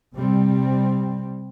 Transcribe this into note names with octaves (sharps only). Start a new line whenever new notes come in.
C3 G3 C4